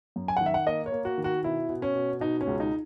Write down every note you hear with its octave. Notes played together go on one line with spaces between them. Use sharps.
F#2
G#5
F#5
D#3
E5
F#5
A#3 D#5
C#5
A#3
F#4
D#3
F#4
B2 E4
B2
C#4
B2
B2 D#4
C#4
C#2
D#4